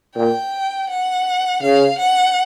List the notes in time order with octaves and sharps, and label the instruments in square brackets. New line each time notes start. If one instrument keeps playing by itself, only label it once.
[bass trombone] A#2 [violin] G5
[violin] F#5
[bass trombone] C#3 [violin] F5
[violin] F#5